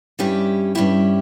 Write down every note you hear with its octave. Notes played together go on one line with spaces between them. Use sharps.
G2 G3 C#4 E4 G4
G2 G3 C#4 E4 G4